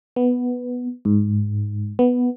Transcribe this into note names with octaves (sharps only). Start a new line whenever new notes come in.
B3
G#2
B3